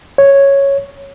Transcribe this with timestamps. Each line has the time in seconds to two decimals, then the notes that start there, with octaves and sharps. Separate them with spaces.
0.18 C#5